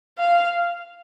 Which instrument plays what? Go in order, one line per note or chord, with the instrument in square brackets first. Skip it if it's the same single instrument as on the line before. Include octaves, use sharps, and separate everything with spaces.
[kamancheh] F5